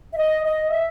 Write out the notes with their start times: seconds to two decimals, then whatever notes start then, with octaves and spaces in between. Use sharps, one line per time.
0.12 E5
0.17 D#5
0.44 D#5
0.70 E5